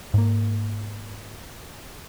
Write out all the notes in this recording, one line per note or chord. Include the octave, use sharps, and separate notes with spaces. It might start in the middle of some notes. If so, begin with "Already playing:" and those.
G#2 A#3